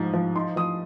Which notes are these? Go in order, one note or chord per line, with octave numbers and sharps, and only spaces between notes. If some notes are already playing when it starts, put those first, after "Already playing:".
Already playing: G#2 F3
F3
D#4 C6
F3 D#6